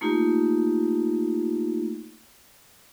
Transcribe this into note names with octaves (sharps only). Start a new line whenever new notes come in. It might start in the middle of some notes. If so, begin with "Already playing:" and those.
A3 A#3 D#4 F4 G4